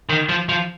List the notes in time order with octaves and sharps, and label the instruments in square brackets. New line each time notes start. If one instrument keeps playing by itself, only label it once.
[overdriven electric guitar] D#3
F3
F3